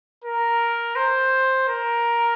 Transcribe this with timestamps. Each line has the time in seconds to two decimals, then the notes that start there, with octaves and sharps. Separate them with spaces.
0.24 A#4
0.96 C5
1.68 A#4